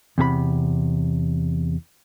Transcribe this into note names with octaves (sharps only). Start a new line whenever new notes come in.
E2 C3 G#4 B5